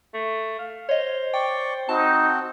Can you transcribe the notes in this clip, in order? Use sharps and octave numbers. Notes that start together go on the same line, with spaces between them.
A3
F5
C5 C#5 D#5
D5 G5 C#6
C4 D#4 F#4 A5